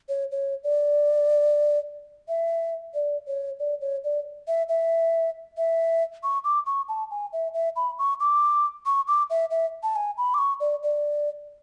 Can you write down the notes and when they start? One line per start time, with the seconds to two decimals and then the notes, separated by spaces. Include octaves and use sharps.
0.09 C#5
0.32 C#5
0.64 D5
2.28 E5
2.94 D5
3.27 C#5
3.60 D5
3.81 C#5
4.04 D5
4.48 E5
4.69 E5
5.57 E5
6.23 C#6
6.44 D6
6.66 C#6
6.88 A5
7.11 G#5
7.33 E5
7.54 E5
7.76 B5
7.99 C#6
8.20 D6
8.86 C#6
9.08 D6
9.30 E5
9.51 E5
9.83 A5
9.96 G#5
10.18 B5
10.34 D6
10.38 C#6
10.60 D5
10.83 D5